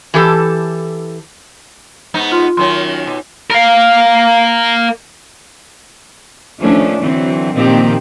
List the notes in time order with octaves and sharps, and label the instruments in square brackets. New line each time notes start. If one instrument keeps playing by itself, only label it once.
[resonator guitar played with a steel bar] E3 G4 A4
[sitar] G#2 B3 D#4
[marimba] F4 C6
[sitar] F#2 D#3 C#4 [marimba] C6
[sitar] B2
[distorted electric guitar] A#4 F5
[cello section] D#3 F3 A3 C#4 D4
D3 E3 F#3 C4
A#2 D#3 F3 A#3 C4 G4